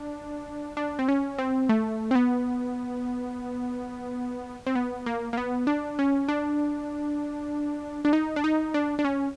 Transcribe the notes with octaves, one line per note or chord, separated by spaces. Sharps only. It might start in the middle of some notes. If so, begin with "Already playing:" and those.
Already playing: D4
D4
C4
C#4
C4
A3
C4
B3
C4
B3
A#3
A#3
B3
D4
C#4
D4
D4
D#4
D4
D#4
D4
D4
C#4